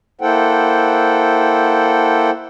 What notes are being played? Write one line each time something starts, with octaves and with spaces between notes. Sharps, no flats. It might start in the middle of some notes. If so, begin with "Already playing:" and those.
A#3 E4 A4 C5 F#5 G5